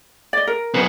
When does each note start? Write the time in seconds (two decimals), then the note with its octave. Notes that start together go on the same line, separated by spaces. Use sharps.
0.33 D5 D#5
0.47 A#4
0.74 F#2 B3